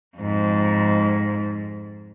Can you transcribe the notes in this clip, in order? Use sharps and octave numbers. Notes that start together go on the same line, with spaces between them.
F2 G#2